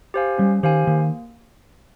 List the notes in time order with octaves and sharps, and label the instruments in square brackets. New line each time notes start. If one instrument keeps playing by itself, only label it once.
[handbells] G4 C5 F5 G#5
[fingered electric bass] G3 [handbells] C#4
[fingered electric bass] D#3 [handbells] G4 C5 F5 G#5
[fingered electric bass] D#3 [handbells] A#3